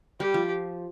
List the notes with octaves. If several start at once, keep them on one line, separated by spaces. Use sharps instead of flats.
G3 G4
F3